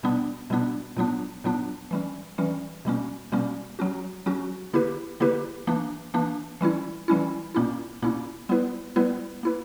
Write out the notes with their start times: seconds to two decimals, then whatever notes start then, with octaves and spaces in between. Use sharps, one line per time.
0.03 B2 G3 B3 D4
0.50 B2 G3 B3 D4
0.97 A#2 F#3 B3 D4
1.44 A#2 F#3 B3 D4
1.91 E3 G3 C#4
2.38 E3 G3 C#4
2.85 B2 G3 A#3 C#4
3.32 B2 G3 A#3 C#4
3.79 F#3 C#4 F#4
4.26 F#3 C#4 F#4
4.73 D3 A#3 E4 G4 B4
5.20 D3 A#3 E4 G4 B4
5.67 E3 A#3 D4
6.14 E3 A#3 D4
6.61 E3 G3 C#4 E4
7.08 E3 G3 C#4 E4
7.54 A#2 A#3 C#4 E4
8.02 A#2 A#3 C#4 E4
8.49 G3 B3 E4 B4
8.96 G3 B3 E4 B4
9.43 A#3 E4 B4